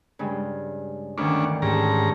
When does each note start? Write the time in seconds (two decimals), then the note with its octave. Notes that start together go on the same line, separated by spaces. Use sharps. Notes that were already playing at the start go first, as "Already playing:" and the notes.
0.19 G2 C#3 G#3
1.18 D2 D#3 E3 C#4 D4
1.62 G#2 C#4 G4 A5 A#5